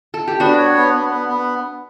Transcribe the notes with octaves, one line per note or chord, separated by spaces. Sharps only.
A4
G4
B3 D4 F#4
C#5
B3
B3
B3
B3